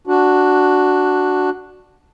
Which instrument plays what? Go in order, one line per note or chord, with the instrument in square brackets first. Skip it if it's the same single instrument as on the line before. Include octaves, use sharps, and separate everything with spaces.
[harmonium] D4 F#4